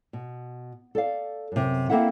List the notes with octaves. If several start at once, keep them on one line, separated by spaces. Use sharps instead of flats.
B2
A4 D5 F5
F#2 C3
A#3 C4 E4 A4 E5 F#5